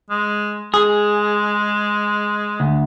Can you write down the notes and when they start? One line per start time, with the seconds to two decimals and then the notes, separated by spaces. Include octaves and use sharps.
0.10 G#3
0.74 G#3 G#4
2.60 D2